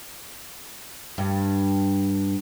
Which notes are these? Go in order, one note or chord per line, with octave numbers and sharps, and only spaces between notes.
G2